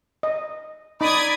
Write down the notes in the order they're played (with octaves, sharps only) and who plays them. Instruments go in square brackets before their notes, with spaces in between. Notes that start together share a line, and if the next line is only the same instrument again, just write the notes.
[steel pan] D#5
[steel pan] D#4 [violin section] D5 D#6 G#6 [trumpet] B5